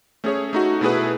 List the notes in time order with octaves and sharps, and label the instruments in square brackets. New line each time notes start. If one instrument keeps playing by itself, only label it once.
[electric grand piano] A3 C#4 G#4 C#5
A3 D#4 F#4
B2 A3 E4 G#4 B4